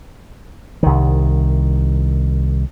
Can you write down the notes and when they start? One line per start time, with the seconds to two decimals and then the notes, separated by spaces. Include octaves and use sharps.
0.83 C2 D#3